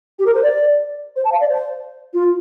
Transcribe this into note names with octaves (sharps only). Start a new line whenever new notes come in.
G4
A#4
C5
D5
C5
A5
F5
D5
C5
F4